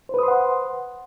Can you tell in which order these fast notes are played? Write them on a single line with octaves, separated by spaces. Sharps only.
C5 B4 D#6 C6 F#5